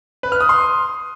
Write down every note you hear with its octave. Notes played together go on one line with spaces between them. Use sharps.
B4
F6
D#6
C6